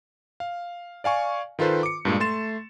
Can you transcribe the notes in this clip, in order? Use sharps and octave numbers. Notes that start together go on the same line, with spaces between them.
F5
D5 F5 G#5 C#6
D#3 F4 A4 B4 C5
D6 C#7
G2 A#2 G#3
A3 C6 A6 E7